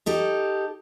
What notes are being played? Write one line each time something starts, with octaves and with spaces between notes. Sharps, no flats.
D#4 G4 A4